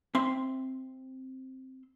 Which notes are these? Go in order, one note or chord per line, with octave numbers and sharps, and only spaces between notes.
C4 E5 C6